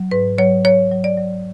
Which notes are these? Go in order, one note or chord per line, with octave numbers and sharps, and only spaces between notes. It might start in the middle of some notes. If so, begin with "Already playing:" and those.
Already playing: F#3
G#2 B4
F#3 C#5
F#3 C#5
F#3
D5
F#3